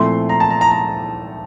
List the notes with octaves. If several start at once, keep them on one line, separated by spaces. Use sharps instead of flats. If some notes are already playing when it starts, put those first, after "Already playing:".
Already playing: A#2 F3 A3 C4 E4 C6
A#5
A5
A#5
A#5
A#5